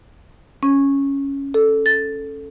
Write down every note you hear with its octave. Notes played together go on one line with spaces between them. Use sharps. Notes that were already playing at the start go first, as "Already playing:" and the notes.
C#4
A4
A6